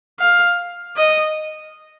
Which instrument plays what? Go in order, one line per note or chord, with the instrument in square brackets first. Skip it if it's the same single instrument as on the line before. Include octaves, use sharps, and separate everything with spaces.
[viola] F5
D#5